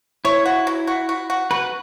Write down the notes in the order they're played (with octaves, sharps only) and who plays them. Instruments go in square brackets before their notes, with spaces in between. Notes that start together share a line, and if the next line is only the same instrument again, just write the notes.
[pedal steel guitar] E4 [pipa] C#5
[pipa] F#4
F#3
F#4
F#4
F#4
[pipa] F#4 [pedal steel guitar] B4